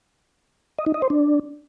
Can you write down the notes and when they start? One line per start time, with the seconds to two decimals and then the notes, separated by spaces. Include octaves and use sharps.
0.79 D#5
0.86 D#4
0.94 D#5
1.02 C5
1.10 D4